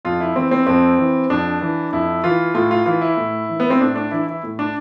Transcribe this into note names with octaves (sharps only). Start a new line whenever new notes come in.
F2 F4
E4
E3 C4
C4
F2 C4
E3
F2 D4
E3
F2 E4
E3 F4
A2 F4
F4
E3 F4
E4
A2
E3
B3
C4
A2 D4
D4
E3 E4
E4
A2
D4